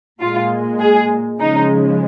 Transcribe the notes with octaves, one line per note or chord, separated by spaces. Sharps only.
A#2 G#3 F4
G#4
C#3 F3 G#3 D#4